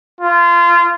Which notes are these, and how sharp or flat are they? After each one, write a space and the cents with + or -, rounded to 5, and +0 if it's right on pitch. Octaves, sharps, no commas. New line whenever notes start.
F4 -25